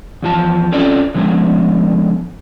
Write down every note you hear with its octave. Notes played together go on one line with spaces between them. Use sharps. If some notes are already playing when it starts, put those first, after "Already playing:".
E2 F3 A5
C4 C#4 F4 A4 D5 D#5
D3 F3 G#3 A3 B3